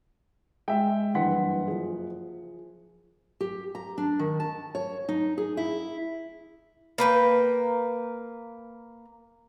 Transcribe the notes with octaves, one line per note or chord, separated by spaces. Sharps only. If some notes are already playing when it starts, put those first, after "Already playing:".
G#3 E5 G5
F#1 G2 E3 F#5 C6 B6
F3 G#4
G4
A#5
D4
D#3
A5
C#5
D#4
G#4
E4
A#3 B4 G5